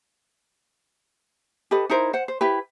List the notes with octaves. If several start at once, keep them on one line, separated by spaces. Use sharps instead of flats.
G4 A4 B4 D#5
D#4 E4 A#4 C5
C5 F#5
C5
E4 G4 B4